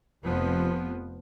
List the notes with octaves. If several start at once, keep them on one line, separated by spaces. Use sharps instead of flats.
F1 F2 F3 B3